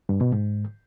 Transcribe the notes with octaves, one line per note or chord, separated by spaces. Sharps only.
G2
B2
G#2